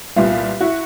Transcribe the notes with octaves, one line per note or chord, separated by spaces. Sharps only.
C2 A#2 G3 B3 F4
E4 F#4